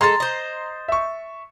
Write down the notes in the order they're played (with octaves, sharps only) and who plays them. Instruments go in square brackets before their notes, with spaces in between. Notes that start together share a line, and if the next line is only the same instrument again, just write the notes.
[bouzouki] G#3 A4 [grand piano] A#5 C6 A6
[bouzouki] C5 D#5
[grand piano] E5 C#6